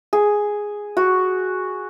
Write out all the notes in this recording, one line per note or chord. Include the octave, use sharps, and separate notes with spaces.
G#4
F#4